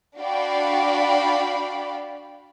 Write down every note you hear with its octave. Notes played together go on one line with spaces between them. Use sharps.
D4 F#4 D5 F5 G5 B5